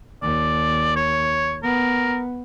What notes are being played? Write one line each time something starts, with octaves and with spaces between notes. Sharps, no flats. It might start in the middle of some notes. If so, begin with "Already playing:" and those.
D#2 D5
C#5
B3 A#4